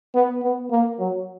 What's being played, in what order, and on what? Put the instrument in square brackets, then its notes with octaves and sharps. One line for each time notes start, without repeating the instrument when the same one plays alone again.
[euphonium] B3
B3
A#3
F#3